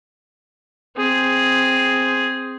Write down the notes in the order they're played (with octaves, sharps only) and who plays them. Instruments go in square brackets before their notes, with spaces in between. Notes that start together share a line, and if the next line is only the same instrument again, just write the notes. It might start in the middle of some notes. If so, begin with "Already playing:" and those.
[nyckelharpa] C4 G#4